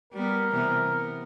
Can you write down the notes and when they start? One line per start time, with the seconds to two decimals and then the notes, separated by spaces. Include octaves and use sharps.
0.13 G3 B3 A#4
0.52 C3 E3 B3
0.85 B3